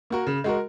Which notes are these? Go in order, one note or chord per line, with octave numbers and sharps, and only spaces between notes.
A#3 F#4 A#4
C#3
G#3 F#4 A#4